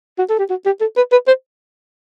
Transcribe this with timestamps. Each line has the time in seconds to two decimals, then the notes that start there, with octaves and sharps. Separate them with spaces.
0.19 F#4
0.29 A4
0.39 G4
0.50 F#4
0.66 G4
0.81 A4
0.97 B4
1.12 B4
1.28 C5